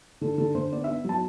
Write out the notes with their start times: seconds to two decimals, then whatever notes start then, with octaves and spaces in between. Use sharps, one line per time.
0.21 D3 A4
0.38 D3 A4
0.55 D3 C5
0.72 B3 D5
0.84 E5
0.88 B3
1.05 F#3 A5